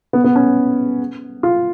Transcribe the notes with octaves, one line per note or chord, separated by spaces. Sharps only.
B3
B3
C#4
F4